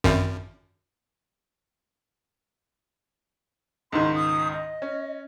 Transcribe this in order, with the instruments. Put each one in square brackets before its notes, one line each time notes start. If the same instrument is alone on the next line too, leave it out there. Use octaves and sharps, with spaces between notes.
[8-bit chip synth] G#1 F#2
[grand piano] C#2 G#2 D#3 [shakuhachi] C6
[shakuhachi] D#6
D#5
[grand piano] C#4